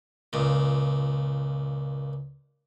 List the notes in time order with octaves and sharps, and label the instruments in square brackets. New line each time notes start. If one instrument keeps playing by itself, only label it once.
[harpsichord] C#2 A#2